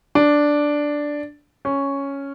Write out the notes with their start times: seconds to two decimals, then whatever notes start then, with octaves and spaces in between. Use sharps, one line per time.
0.15 D4
1.65 C#4